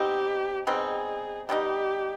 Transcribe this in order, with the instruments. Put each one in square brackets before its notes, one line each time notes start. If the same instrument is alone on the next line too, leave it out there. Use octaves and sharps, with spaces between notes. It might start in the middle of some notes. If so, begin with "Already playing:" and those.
Already playing: [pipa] B2 G3 C4 D#4 [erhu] G4
[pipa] B2 G3 C4 D#4 [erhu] G#4
[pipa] B2 G3 C4 D#4 [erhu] G4